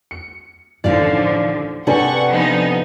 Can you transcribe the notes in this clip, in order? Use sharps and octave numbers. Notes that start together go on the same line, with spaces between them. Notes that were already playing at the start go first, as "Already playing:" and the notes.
C#7
A1 D#2 D3 F3 D5 F5
C3 D4 A4 B4 F#5 G#5 C#6
F3 B3 D#4